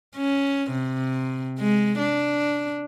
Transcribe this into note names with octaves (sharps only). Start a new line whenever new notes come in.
C#4
C3
G#3
D4